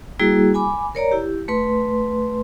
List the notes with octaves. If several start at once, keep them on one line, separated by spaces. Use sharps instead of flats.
G3 A#3 E4 F#4 G#4
G#5 B5 D6
A#4 C#5 D5 A#5
E4 G4
A3 B4 C6